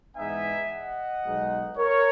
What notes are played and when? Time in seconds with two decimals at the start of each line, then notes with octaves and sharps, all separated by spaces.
0.15 G#2 E3 G#3 B3 D#4 E5 G#5
0.70 D#5 F#5
1.24 B1 B2 G#3 D#4
1.77 A#4 C#5